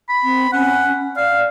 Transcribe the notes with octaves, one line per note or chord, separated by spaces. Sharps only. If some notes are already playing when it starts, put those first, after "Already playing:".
B5
C4
C#4 F#5
D5 F5